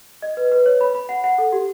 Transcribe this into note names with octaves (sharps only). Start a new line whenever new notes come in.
D#5
B4
B4
C#5
B5
B5
F#5
F#5
A4
G4